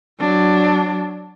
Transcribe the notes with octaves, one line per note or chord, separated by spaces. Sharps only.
F#3 D4